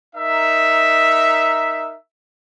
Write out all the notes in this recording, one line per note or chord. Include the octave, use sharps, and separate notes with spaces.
D#4 A#4 E5